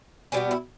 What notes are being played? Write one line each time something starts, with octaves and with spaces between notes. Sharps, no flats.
B2 G3 B3 C#4
E4